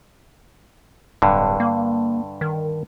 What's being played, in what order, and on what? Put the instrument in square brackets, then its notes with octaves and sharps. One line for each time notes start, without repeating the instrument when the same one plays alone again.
[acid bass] D1 [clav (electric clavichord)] G2 D3
[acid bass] A#3
D#3